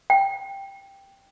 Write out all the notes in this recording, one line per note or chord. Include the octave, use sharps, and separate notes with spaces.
G5